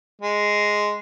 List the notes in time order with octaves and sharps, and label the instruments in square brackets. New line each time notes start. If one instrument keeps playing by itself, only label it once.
[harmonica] G#3